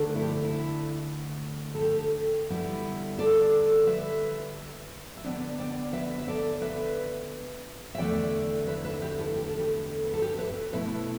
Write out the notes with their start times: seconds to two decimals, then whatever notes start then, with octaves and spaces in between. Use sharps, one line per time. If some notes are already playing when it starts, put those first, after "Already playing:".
Already playing: D2 D3 A3 D4
0.16 E4
0.22 G4
0.44 E4
1.75 A4
1.81 G4
2.50 D3 G3 B3 E4
3.19 A4 D5
3.87 B4 E5
5.17 E5
5.24 D3 B3 D4 D5 G5
5.59 D5 G5
5.93 B4 E5
6.18 E5
6.28 A4 D5
6.61 B4 E5
7.95 E5
7.98 E2 D3 A3 D5 G5
8.67 B4 E5
8.85 B4 E5
9.02 G4 B4
9.18 E4 A4
9.36 G4
9.49 A4
9.58 G4 B4
10.05 B4
10.14 A4
10.22 G4 B4
10.38 B4 E5
10.73 B2 A3 E4 B4 E5